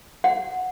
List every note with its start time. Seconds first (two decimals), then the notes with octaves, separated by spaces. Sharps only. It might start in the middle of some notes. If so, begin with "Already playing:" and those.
0.24 F#5